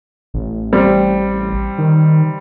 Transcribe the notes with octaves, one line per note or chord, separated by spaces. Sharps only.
A1
G3 C4
D#3